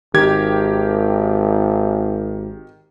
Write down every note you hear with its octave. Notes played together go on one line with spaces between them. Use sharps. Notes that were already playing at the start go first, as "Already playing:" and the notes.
G#1 D#3 G4 G#6